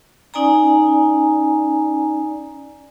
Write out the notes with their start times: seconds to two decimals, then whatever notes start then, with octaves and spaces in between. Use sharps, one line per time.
0.34 C#4 D#4 D5 G#5 A#5